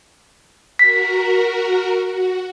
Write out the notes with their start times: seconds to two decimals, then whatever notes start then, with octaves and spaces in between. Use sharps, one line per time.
0.79 F#4 A#4 B6
2.05 F#4